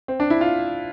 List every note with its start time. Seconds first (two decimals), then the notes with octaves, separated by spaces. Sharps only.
0.08 C4
0.20 D4
0.30 E4
0.41 F4